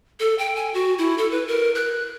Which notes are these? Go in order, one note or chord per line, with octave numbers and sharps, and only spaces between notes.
A4
G5
G#5
F#4
E4
A4
B4
A#4
F#6